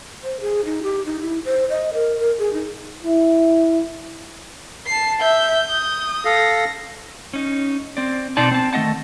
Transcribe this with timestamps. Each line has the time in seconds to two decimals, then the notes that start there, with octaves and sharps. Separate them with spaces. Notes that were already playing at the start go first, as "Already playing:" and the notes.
0.23 C5
0.41 G#4
0.65 D#4
0.83 G4
1.06 D#4
1.22 E4
1.45 C5
1.70 D#5
1.94 A#4
2.20 A#4
2.39 G#4
2.53 D#4
3.04 E4
4.86 A5 C7
5.21 E5 G6
5.71 D#6
6.25 A4 F5 A#6
7.34 C#4 D#4
7.97 C4 D5
8.37 B2 C4 D#4 D5 A5
8.51 C4 A5
8.73 D#3 A3 G4 D#5 F#5 A5